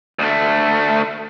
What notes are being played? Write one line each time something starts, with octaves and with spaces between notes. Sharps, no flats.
D2 A3